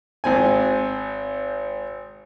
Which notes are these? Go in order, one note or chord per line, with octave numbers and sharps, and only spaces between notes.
G#1 C4 G#5